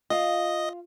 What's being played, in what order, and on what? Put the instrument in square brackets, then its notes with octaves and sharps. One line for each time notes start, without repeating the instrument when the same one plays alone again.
[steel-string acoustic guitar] F4 F5 [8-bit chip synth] D#5